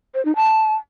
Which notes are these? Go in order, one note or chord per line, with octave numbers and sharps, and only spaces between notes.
C5
D#4
A5